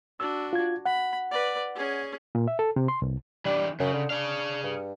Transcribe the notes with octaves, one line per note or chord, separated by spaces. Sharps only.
D4 F#4 E6
F4 G#6
F#5 B5
B4 D5
C#4 G#4
A#2
E5
A4
C3
C6
C2
E3 G3 D4
F#2 C#3
D3
D4 G#4 F5
G2